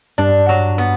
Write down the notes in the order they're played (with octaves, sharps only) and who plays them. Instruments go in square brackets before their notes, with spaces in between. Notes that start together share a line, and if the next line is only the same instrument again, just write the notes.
[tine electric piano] G2 [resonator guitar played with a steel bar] D4
[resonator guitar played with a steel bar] F#3
B3